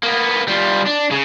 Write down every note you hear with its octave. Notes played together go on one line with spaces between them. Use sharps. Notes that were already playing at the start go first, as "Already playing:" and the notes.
A#3 B3
G3 F4
D4
C#3